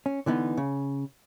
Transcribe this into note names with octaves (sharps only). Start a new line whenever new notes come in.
C#4
D3 E3 B3 D#4
C#3